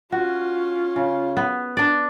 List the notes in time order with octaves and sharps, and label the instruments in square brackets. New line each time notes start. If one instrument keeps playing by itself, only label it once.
[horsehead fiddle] C#4 F4 [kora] F#4
[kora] C#3
B3
D4 D5